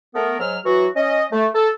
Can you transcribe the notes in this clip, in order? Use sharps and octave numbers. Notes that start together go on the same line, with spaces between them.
A3 B3 A#4
G#2 F#3 F6
E3 F#3 F#4
C#4 D#5
A3
A4